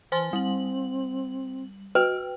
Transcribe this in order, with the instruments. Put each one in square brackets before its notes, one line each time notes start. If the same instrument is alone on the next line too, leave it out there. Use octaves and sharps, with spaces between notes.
[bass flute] E3 [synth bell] C5 G#5 C6
[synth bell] G3 F#7 [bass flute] C4
[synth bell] F#4 G5 [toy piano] B4